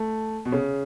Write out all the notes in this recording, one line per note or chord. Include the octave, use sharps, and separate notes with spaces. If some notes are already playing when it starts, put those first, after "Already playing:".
Already playing: A3
B2
C#3